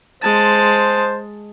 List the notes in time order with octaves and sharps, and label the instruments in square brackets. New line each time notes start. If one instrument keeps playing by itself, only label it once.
[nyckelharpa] G#3 A5 [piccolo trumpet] C5